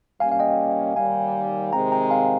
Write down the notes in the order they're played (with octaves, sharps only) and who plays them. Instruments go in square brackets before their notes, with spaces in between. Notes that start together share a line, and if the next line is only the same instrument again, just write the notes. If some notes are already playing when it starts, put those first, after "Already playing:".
[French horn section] G3 A#3 C#4 [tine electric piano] F5 G#5
[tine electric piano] F5
D#5 G5
[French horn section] D#2 D#3 G3 [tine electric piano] F5 G#5
[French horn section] C3 D#3 G#3 C4 [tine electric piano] G5 A#5
[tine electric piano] G5 A#5
F5 G#5